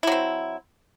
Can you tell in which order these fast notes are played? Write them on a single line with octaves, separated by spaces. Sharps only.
E4 F#3 C4